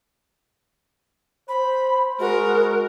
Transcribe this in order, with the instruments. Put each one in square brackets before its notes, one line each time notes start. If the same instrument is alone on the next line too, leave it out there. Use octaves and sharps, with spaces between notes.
[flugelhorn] C5 [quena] B5
[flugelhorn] G#3 [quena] F#4 [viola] A#4